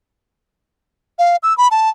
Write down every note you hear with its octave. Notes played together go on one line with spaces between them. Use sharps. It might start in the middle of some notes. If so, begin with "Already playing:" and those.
F5
E6
B5
A5